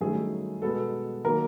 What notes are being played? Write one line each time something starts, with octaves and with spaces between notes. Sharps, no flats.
G2 D#3 F#3 A3 C#4 G#4
B2 G#3 B3 A4
D#3 F#3 A#3 A#4